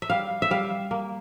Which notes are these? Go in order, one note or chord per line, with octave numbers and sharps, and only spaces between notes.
E5
G3 F5
E5
G3 F5
A#3